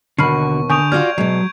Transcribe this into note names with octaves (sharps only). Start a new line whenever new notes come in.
D#2 B2 D3 F#4 B5 C#6 F6 C7
D3 G#5 C#6 D#6 G6 D7 F7
F4 F#4 D5 F6 G#6
B2 F#3 G#3